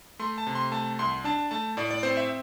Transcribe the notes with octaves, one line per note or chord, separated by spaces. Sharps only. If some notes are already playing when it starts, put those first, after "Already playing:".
A3 C6
A5
C3
C6
A3 A5
C2 C6
D4 A5
A3 A5
A2 D5
D5
C4 C5
E5